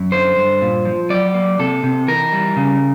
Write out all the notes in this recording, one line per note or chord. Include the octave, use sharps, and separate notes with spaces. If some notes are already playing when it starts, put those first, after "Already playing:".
Already playing: F#2
D3 C5
G2
A#2
F3
F#3 D5
A#3
C3 A4
C3
E3 A#4
G3
C#3